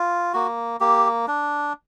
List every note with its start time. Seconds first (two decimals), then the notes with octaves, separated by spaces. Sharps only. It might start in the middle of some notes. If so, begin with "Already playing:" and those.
Already playing: F4
0.33 A#3 F#4
0.80 A#3 G4
1.28 D4